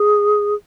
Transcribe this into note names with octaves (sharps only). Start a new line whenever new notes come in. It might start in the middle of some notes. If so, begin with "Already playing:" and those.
Already playing: G#4